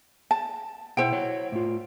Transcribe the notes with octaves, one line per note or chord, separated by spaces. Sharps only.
A5
B2 E4 C5 F#5 G5
C#5 F#5
A2 F4